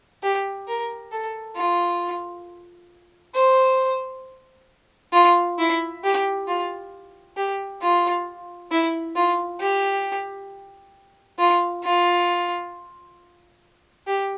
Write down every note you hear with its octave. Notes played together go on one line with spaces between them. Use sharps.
G4
A#4
A4
F4
C5
F4
E4
G4
F4
G4
F4
E4
F4
G4
F4
F4
G4